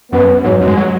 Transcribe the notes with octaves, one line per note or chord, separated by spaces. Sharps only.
F#2 B3
G#2 F#3
F#2
G#3
F#3